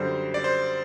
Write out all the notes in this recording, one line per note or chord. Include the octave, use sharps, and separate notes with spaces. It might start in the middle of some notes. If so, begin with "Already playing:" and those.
Already playing: F#2 D3 G3 C5
D5
C5